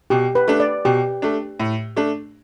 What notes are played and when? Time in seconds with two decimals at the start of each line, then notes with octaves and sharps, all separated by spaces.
0.10 B2 G4
0.35 B4
0.48 A3 D4
0.60 D5
0.85 B2 G4
1.22 A3 D4
1.60 A2
1.96 A3 D4